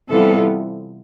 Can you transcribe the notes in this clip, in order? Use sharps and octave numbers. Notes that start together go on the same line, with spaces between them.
C3 E3 G3 B3 F4 A4